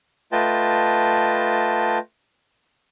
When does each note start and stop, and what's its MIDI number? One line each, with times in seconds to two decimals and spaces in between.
0.32 1.98 57
0.32 1.98 65
0.32 1.98 71
0.32 1.98 75
0.32 1.98 79
0.32 1.98 81